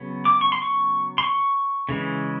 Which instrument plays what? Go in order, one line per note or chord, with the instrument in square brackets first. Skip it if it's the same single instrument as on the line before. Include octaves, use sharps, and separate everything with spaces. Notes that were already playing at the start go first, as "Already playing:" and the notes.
Already playing: [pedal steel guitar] C#3 F#3 B3
D6
C#6
C6
C#6
C6
C#6
C#3 E3 G#3